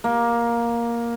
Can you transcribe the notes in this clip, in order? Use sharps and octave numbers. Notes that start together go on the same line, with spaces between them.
A#3